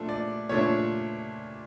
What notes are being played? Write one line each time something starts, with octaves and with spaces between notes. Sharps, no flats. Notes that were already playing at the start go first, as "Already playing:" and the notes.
Already playing: A#2 F3 A3 D4
D5
A#2 F3 A3 D4 C#5